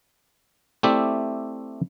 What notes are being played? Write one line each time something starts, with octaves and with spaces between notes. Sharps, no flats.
A3 C4 E4 G4 D5 E5